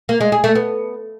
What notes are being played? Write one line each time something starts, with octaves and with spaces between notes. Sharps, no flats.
A#3
G#3
G#4
A3
B3